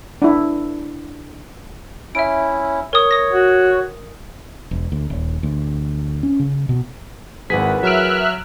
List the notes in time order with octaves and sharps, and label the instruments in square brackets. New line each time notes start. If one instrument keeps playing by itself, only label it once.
[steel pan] D4 E4
[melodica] C#4 E4 [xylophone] E5 D7
[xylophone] A#4 D#6 [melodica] C#5
[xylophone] D#6 A#6
[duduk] F#4
[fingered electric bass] E1
D2
D#1
D2
C#4
C#3
B2
[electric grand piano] G#1 B6 [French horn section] E3 A#4 B4 [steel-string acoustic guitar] G#4 F#5
[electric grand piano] F#3 D7 [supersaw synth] E5 F6 F#6